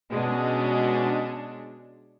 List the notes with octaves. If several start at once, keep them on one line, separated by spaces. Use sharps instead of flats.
B2 G#3 C#4 D4